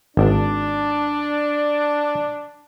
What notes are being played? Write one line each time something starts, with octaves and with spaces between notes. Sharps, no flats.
G#1 D4